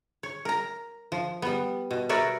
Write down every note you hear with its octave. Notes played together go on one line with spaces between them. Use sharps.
C#5
A#4 A#5
F3
G3 B3
B2
A#4 B4 C#5 D5 E5